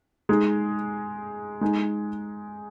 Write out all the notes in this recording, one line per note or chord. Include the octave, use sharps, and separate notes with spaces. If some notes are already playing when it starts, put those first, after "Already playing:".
G#3 D#4 G#4
G#3 D#4 G#4